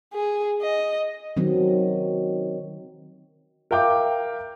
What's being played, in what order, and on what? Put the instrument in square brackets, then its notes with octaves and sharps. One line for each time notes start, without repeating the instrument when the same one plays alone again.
[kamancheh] G#4
D#5
[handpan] D#3 F#3 C4
[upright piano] A#4 E5 F5 G5 D6 G6